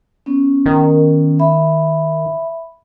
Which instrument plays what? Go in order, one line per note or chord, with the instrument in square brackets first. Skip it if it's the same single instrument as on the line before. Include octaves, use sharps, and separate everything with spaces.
[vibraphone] B3 C#4
[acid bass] D#3
[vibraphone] E5 B5